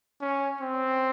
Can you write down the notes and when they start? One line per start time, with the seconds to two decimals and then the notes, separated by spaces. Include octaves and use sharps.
0.21 C#4
0.61 C4